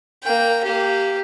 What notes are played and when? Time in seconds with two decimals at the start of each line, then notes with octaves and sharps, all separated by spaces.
0.23 A#3 G5
0.64 A#3 G4